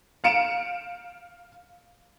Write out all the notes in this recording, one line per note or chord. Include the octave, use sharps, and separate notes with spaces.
F5 C#7 D7 E7